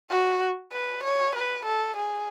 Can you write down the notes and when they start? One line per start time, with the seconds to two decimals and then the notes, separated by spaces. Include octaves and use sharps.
0.10 F#4
0.72 B4
1.03 C#5
1.35 B4
1.65 A4
1.96 G#4